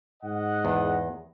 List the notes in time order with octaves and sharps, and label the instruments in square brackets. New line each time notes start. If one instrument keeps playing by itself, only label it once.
[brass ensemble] G#2 D#5 F#5
[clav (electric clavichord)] E2